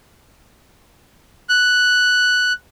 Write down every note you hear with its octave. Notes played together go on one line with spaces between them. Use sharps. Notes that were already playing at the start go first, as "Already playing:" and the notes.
F#6